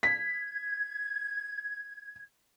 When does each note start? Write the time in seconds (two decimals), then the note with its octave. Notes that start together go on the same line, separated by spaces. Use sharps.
0.03 G#6 B6